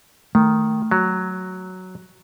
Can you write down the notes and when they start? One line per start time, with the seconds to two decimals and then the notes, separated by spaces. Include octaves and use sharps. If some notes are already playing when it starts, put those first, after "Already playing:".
0.35 D#3 A3
0.91 F#3